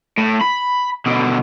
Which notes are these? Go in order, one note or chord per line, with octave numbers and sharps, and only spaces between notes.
A2
B5
B2 D3